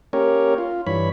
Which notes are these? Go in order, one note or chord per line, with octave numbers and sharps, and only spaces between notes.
A#3 C#4 G4 A#4 C#5
F4
G2 E3 C#5 B5